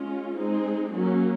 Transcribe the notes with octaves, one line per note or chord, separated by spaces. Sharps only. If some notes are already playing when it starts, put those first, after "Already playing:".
Already playing: G#3 C#4 F4
G#3 C4 D#4 G#4
F#3 A#3 C#4